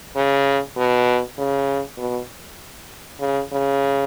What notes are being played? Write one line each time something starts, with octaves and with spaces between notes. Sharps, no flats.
C#3
B2
C#3
B2
C#3
C#3